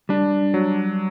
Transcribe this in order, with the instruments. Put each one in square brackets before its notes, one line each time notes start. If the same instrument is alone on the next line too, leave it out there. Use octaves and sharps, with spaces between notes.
[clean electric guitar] G3 [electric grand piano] D4
[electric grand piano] F#3